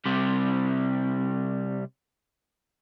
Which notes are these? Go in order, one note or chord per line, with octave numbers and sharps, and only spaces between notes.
C3 G3